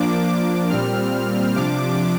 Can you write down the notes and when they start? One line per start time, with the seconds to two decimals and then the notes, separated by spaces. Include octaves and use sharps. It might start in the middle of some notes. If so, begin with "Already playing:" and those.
Already playing: F3 A#3 D4 D6
0.27 D6
0.70 A#2 G3 C4 F6
1.56 C3 F3 D4 D6